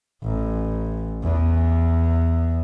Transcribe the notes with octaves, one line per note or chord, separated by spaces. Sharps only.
A1
E2